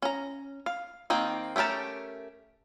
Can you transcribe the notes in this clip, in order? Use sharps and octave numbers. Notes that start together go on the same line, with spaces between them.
C#4 A#5
F5
D#3 A#3 C4
A3 C#4 G4 A#4 A5